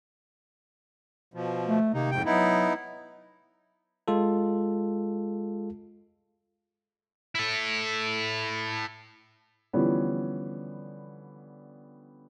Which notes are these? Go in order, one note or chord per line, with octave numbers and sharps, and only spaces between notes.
B2 F3
A3
C3 D#3 A#3 D#4
F2 G#2 G5
F#3 B3 D#4 E4
G#3 F4 A4
E4 A4
D3 E3 F3 G3 B3 C#4